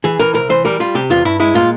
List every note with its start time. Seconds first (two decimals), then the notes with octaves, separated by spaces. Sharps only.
0.04 E3 G#4
0.20 E3 A#4
0.34 C2 A#4
0.49 E3 C5
0.65 G3 A#4
0.80 G3 F4
0.95 C3 G4
1.10 E2 F4
1.25 G2 E4
1.40 G#3 E4
1.54 A#2 F4